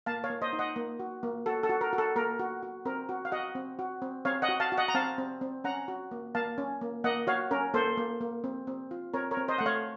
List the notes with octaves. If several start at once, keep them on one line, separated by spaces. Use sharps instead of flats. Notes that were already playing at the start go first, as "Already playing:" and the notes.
A#3 F5 A5
C#5 F5
A#3
C5 D#5
D#4
D#5 F#5
A#3
F#4
A#3
F#4 A4
A4
F#4
A#4
F#4
A4
A#3 A#4
F#4
F#4
C4 A#4
F#4
F5
F#4 D#5 F#5
C4
F#4
C4
C4 C#5 F5
D#5 F#5
F#4
F5 A5
F#4
D#5 F#5
A#5
C4 F5 A5
C4
C4
C#4 F#5 A#5
F#4
A#3
A#3 F5 A5
C#4
A#3
A#3 D#5 F#5
F#4 C#5 F5
C#4 A#4
A#3 A4 C5
A#3
A#3
C4
C4
F4
C4 A#4 C#5
A#4 C#5
C4
C5 D#5
A3 F#5
C#5 F5